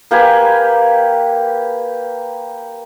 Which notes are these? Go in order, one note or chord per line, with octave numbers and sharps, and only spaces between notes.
A#3 G4 B4 G#5